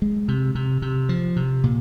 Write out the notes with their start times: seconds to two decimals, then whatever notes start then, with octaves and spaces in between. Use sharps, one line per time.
0.02 G#3
0.28 C3
0.55 C3
0.82 C3
1.09 F3
1.36 C3
1.64 A#2